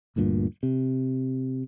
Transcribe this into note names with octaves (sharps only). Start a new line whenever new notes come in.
G1 D2 G2 A#2
C3